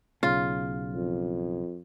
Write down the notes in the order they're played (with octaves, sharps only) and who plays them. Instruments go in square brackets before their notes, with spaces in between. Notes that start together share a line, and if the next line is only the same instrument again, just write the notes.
[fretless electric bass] B1 C#3 [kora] F4
[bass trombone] F2